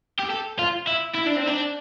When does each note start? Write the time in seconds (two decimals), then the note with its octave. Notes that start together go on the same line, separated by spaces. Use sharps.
0.19 G4
0.30 A4
0.59 F4
0.87 E4
1.15 E4
1.27 D4
1.37 C4
1.47 D4